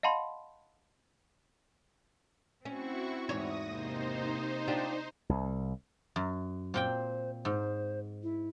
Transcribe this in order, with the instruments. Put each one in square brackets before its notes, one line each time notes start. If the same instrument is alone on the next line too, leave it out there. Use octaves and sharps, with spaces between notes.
[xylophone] D#5 F5 F#5 A5 B5 C6
[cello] C4 [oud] C#4 [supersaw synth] E4 F#4 C#6
[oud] E2 G#2 C#5 [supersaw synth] D#6 A#6
[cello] C3 A#3 [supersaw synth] D#4 C5
[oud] D4 F4 G4
[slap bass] C2
[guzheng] F#2
[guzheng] A#2 C4 G5 [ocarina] C5
[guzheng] G#2 [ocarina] C5
[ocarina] E4